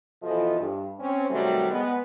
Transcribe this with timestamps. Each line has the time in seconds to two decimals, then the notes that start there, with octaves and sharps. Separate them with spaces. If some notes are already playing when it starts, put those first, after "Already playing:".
0.22 B2 E3 F3 F4 A4 D#5
0.60 G2
0.99 C4 C#4
1.30 C3 D#3 F#3 G3 A3
1.70 G#3 B3